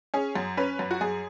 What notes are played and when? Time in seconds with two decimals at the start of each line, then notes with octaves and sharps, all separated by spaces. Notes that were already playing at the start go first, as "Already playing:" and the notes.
0.14 C#4 G#4
0.36 F#2
0.57 C#4 B4
0.79 F#2
0.91 F#4
1.01 F#2 G#4